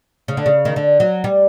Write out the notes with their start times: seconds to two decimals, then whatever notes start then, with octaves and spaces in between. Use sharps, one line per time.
0.28 C#3
0.37 D3
0.46 C#3
0.65 D#3
0.76 D3
1.00 F#3
1.24 G3